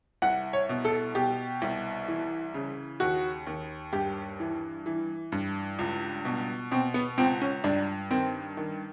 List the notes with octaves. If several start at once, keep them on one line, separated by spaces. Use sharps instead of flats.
C2 F#5
C#5
B2
A4
B2 G4
C2
E3
C#3
D#2 F#4
D#2
G2 G4
E3
E3
G2
C#2
B2
B2 C4
B3
C#2 C4
C#4
G2 D4
D#3 C4
D#3